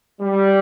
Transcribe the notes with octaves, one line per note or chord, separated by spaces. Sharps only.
G3